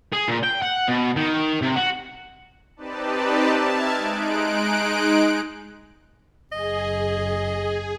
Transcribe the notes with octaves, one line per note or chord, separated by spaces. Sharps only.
G#4
A#2
G5
F#5
B2
D#3
C3
F#4
C4 D#4 G4 B4 D5 A5
E5 A5 F6 G#6
G#3 D#4 F#6 D7
F#1 G#4 D#5